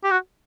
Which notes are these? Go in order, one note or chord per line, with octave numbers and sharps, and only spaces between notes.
G4
F#4